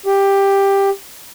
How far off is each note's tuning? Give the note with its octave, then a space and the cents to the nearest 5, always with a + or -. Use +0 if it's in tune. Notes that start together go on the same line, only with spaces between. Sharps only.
G4 +10